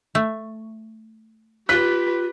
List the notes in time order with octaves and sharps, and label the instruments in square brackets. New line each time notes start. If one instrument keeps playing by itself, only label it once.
[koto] A3
[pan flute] F4 [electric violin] G4 B4 [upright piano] F#6 B6